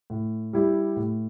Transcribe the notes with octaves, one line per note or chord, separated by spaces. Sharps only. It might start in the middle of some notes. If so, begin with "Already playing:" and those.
A2
G3 E4 G4
A2